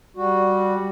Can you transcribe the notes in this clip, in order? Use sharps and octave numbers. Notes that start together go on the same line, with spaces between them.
G3 F#4